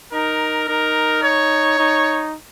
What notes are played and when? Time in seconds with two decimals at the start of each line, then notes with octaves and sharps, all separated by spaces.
0.13 D#4 A#4
0.68 D#4 A#4
1.23 C#5
1.79 D#4